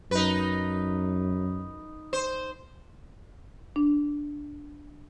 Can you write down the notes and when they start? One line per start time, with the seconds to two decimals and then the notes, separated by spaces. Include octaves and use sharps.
0.11 F#2 D#4 B4
2.13 C5
3.76 D4